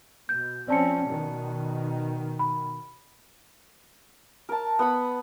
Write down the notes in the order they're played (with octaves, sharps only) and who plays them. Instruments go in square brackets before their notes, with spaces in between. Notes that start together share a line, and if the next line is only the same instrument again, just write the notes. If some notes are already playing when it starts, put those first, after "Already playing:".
[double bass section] B2 [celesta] G6
[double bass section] F3 C4 C#4 [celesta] D5 A5 C#7
[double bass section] B2 D#3
[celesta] B5
[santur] A#4 A5
B3 F#5 B5